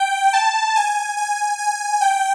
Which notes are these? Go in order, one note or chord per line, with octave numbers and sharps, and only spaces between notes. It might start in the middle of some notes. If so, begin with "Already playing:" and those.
Already playing: G5
A5
G#5
G#5
G#5
G5